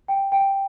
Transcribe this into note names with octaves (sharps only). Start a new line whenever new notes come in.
G5
G5